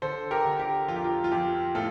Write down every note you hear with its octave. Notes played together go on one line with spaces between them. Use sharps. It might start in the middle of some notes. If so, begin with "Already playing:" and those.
D3 A4 C5
G4 A#4
D3
G4
F2 F4
G4
F4
F4
F2 G4
A2 F4 A4